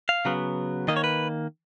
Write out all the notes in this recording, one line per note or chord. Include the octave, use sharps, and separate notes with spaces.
F5
C#3 F#3 B3
D#3 A#3 D#5
C#5
B4